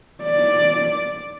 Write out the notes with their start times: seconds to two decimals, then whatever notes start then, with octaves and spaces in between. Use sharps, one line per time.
0.24 D5